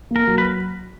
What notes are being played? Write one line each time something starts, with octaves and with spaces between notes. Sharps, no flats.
A#3
A#4
F#3
B4